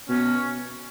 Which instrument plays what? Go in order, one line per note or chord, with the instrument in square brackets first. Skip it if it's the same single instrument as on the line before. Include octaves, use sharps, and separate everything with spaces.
[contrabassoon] B2 [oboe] C#4